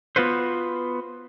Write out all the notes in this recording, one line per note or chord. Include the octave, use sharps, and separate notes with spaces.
B3 F4 F#4 B4 C5